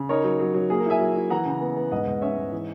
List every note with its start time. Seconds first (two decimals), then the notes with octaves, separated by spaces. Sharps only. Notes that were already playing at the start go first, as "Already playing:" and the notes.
Already playing: C#3
0.09 D#4 A#4 C#5
0.24 F#3
0.40 F#3
0.54 F#3
0.70 A#3 G#4
0.80 A#4
0.86 E4 E5 G#5
1.00 F#3
1.16 E4
1.30 E3 F#5 A#5
1.46 C#3
1.61 B3
1.77 B3
1.92 G#2 D#5 F#5
2.07 G#2
2.22 C#4 C#5 E5
2.38 G#2
2.52 E3